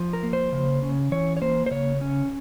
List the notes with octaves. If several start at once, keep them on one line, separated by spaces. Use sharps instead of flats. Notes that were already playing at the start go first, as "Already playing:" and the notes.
Already playing: F3
A#4
A#3
C5
C#3
C#4
E3 C#5
C#5
A#3 C5
C5
C#3 C#5
C#4